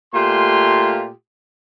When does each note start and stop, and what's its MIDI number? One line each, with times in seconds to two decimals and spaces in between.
0.14 1.10 46
0.14 1.10 57
0.14 1.10 65
0.14 1.10 67
0.14 1.10 84